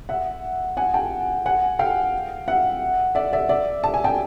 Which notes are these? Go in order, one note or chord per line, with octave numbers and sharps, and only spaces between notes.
E5 F#5
F#5 G#5
G5 A5
F#5 G#5
F5 G5
E5 F#5
D5 E5
D5 E5
D5 E5
A5
G#5
G5 A5